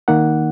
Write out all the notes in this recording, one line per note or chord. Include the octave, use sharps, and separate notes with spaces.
D#3 A#3 D#4 F#5